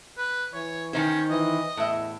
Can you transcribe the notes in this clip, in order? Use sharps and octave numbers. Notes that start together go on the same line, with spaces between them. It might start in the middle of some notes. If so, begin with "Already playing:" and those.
B4
E3 C#5
D#3 C#4 D#4 C5
E3 D#5
E2 A2 E5